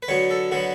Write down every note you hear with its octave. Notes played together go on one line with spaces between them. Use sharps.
B4
D3 F#3 B3 C#5
A4
D3 F#3 B3 F#4